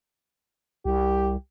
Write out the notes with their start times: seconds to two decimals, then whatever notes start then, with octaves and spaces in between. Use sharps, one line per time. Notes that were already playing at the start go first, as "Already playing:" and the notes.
0.85 C2 G4